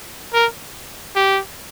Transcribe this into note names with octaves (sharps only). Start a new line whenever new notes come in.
A#4
G4